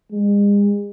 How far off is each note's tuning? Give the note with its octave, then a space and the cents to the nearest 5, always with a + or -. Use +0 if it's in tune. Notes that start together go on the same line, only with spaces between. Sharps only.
G#3 -40